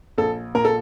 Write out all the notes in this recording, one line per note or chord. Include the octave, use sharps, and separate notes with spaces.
A#1 A4
A#2 A#4
A4